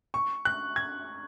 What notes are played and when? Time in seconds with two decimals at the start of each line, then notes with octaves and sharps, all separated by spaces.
0.14 C#6
0.45 F#6
0.76 G#6